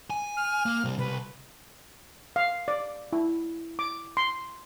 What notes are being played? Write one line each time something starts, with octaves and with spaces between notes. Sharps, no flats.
G#5
F6
A#3
C3 G3
C2 B4
F5
D5
E4
D6
C6